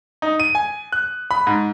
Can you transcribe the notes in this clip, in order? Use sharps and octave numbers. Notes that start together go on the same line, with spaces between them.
D#4
D#7
G#5
F#6
B5
G#2